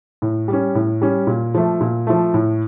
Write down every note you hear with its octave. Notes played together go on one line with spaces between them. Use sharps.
A2
G3
C#4
A2
G3 C#4
A#2
F3 A3
A#2
F3 A3
A2